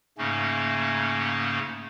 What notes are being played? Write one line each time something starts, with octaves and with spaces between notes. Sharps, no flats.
G#2 C#3 A3 A#3 C#4